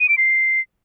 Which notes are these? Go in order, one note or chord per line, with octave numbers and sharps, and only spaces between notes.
D#7
D7
C7